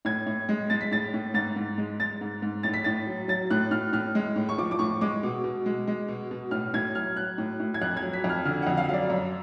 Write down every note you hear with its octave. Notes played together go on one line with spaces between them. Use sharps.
A2 G#6
A2
G#3
G#3 A6
B6
A2 A6
A2
G#2 A6
G#2
G#3
G#3 A6
G#2
G#2
A2 A6
B6
A2 A6
F#3
F#3 A6
A2 F#6
A2 F6
A2 F6
G#3
A2
C#6
F3 D6
D6
A2 C#6
G#3 D6
B2
B2
G#3
G#3
B2
B2
A2 F6
A2 G#6
F#3 F6
F#3 F#6
A2
A2
G#6
F2 F#6
G#6
F#3
B6
F2
F6
D3 F6
F2 F#5
F5
F#3 D5 F5
F#2